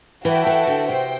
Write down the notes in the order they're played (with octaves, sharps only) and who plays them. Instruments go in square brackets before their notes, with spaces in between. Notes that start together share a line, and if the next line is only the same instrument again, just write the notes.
[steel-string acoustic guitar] E3 [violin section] F#4 A4 E5 G5
[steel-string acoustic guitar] E3
D3
[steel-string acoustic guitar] C3 [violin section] C5 G5